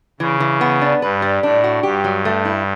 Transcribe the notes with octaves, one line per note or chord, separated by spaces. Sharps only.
C#3 E3
E3
B3
D4
G2 B4
G3
A2 D4
F#4
G2 G4
F#3
A3
E4